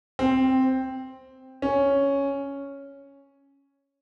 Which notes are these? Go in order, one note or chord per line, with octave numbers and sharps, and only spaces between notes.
C4
C#4